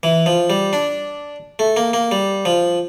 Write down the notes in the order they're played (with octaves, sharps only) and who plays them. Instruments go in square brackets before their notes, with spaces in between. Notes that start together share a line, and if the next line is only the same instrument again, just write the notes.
[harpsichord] E3
F3
G3
D4
A3
A#3
A#3
G3
F3